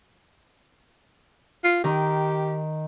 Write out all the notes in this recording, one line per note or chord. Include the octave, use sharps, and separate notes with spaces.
F4
D#3 G4